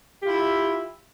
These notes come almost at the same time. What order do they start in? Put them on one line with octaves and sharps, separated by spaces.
G4 F4 E4 E5